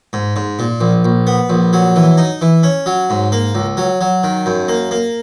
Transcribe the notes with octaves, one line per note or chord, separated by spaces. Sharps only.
G#2
G#2
A#2
A#1
A#1
B3
A#1
F#3
E3
D#4
E3
C#4
F#3
G#2
A#3
C#2
F#3
F#3
D#3
F#2
A#3
A#3